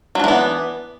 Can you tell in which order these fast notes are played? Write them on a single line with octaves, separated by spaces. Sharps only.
F#3 D4 E3 B3